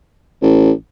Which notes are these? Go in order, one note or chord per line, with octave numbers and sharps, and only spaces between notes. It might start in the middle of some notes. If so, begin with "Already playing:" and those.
A1